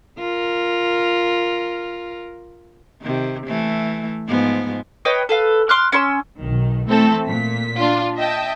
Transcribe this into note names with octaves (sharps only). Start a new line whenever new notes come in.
F4 A#4
C3 D#3
E3 A3
G#2 F3 B3
B4 C#5 D#5 G5
A4 B4 F5
C6 D6 F6 F#6
C#4 C6 C#6 E6
B1 D#3
E3 A3 C4 A4
A#2 B6
D4 F4
D#5 E5 G5 A5